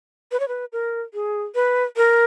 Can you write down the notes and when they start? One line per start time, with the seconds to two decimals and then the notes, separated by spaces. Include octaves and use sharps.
0.32 B4
0.40 C#5
0.48 B4
0.73 A#4
1.14 G#4
1.55 B4
1.97 A#4